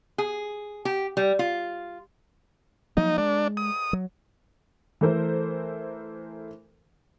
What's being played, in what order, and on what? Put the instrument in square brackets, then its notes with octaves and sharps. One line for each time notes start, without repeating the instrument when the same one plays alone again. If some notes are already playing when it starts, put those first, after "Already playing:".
[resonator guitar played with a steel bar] G#4
G4
G3
F4
[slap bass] F3 F#3 A#3 [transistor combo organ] D#4
[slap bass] G#3 [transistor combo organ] D4
[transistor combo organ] D#6
[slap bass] F#3
[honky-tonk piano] E3 A3 A4 A#4 C5